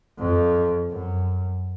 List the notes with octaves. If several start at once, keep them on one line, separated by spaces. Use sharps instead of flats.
F2
F#2